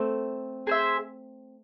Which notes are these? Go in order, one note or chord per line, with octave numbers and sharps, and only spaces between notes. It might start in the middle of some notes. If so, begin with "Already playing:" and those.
Already playing: A3 C4
G#4 C5 E5